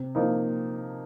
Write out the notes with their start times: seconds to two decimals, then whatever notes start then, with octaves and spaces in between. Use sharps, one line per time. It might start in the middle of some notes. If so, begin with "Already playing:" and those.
Already playing: C3
0.15 F3 A#3 D#4